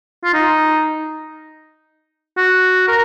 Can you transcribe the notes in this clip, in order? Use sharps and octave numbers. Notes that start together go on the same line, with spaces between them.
F4
D#4
F#4
A#4